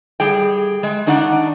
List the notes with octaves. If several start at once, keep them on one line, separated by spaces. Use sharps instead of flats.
G3 G#4 G5
G#3
D#3 D4 D#4 D5 F#5